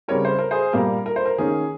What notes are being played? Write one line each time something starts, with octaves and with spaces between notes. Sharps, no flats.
C#3 G3 C4 A#4 C#5
C5
A#4
G#4 C5
A#2 G3 A#3 A#4
A#4
C5
A#4
D#3 A#3 C#4 G#4